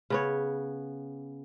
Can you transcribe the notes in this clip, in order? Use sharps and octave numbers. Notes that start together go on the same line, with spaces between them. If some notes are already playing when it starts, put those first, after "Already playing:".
C#3 B3 C#5